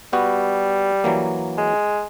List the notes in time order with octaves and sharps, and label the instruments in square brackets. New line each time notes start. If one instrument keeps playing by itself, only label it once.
[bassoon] G3 [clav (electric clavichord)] B3 F#4
[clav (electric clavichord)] E3 F#3 A#3
[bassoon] G#3